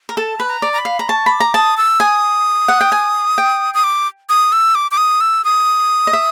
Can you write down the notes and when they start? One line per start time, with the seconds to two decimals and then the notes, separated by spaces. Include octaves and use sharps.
0.09 A#4
0.17 A4 A5
0.39 B4 B5
0.48 A#5
0.62 D5
0.73 A#5
0.78 B5
0.85 F5
0.99 A#5
1.08 A5 C#6
1.26 B5
1.32 D6
1.40 A#5
1.54 A5 D#6
1.77 E6
2.00 G#5 D#6
2.68 F#5
2.81 G5
2.92 G#5
3.38 G5
3.74 D#6
3.84 D6
4.29 D#6
4.52 E6
4.75 D6
4.91 D6
4.97 D#6
5.21 E6
5.44 D#6
6.07 D#5
6.13 E5